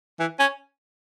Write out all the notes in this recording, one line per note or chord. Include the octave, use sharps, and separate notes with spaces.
E3
C#4